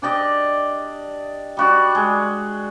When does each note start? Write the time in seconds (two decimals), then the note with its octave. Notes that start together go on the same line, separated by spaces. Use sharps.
0.02 D4 G4 D5 D#5
1.57 G3 F#4 D5
1.95 G#3